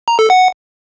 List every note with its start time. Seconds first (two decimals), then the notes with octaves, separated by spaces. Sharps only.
0.08 A#5
0.19 A4
0.30 F#5